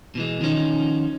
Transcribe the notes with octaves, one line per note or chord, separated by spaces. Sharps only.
B2 E3 G#3
D#3 F3 C#4 D#4